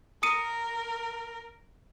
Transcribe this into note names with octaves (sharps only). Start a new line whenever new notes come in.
A#4 D#6 C#7 D#7